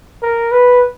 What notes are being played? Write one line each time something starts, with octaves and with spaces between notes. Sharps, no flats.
A#4
B4